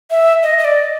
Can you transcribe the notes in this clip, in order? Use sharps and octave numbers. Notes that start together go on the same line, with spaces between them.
E5
D#5
D#5
D5